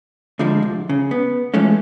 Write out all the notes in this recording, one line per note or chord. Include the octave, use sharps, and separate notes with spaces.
D2 C3 F3 G#3 D4
C2
C#3
B3
E3 F3 G#3 A3 C#4